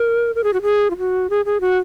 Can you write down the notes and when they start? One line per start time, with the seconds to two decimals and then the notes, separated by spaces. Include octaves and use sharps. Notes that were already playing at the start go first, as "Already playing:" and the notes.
Already playing: A#4
0.35 A#4
0.44 G#4
0.53 F#4
0.62 G#4
0.91 F4
0.98 F#4
1.30 G#4
1.45 G#4
1.61 F#4